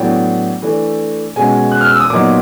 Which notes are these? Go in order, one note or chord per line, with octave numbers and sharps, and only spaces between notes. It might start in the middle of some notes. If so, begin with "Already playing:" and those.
Already playing: A2 F#3 B3 D4 G5
E3 A3 D4
B2 G#3 C#4 G#5
F#6
F6
E6
D#6
A#2 F#3 B3 D#4 D6